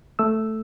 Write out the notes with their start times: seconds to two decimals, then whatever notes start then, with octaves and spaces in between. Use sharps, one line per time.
0.19 A3 E6